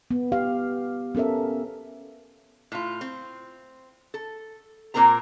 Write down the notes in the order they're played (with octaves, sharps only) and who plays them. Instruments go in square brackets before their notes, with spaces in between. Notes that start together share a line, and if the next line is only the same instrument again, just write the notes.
[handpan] B3
G4 F5
B3 C#4 A4 A#4 E5
[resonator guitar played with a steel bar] A2 F4
C4
A4
A#2 A#3 C4 A#4 A#5